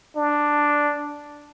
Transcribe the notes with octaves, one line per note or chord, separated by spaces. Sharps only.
D4